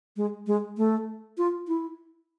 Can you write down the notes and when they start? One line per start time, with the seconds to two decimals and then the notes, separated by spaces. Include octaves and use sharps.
0.16 G#3
0.47 G#3
0.77 A3
1.38 F4
1.68 E4